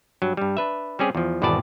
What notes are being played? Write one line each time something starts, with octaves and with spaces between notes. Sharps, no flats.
G2 F#3
G2 G3
D4 B4 E5
G3 C4 C#4 G4 G#4
E2 F3
G#1 E2 B2 B4 D5 A5